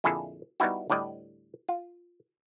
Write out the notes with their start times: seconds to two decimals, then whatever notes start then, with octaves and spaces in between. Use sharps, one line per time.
0.04 F2 A#2 D3 E4 G#4 A4
0.60 G3 B3 D#4 E4 F#4
0.90 D2 A2 G3 D5 D#5
1.69 F4